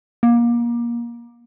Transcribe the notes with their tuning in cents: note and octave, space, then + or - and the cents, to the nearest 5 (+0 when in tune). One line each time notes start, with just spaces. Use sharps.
A#3 +25